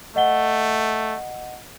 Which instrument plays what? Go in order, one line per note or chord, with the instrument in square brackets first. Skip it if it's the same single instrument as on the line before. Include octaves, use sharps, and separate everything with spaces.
[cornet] A3 [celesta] D#5 F#5 G7